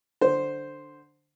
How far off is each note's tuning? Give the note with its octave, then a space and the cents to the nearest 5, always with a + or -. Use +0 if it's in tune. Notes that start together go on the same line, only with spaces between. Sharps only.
D3 +5 C5 +0